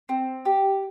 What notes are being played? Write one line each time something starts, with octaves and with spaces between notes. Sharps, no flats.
C4
G4